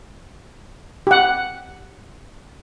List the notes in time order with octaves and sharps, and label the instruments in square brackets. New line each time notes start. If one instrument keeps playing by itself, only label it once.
[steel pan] G4 F#5